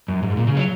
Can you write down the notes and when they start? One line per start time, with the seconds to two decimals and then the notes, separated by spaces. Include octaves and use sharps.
0.08 F#2
0.23 G#2
0.37 A#2
0.47 C#3
0.56 F#3